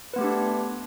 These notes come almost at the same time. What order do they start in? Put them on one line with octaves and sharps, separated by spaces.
B4 B3 A3 G4 D4